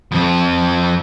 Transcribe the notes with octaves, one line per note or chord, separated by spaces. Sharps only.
F2 C4